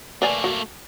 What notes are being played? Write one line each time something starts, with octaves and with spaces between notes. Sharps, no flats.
A3 A#3 B4 D5 G#5
F#4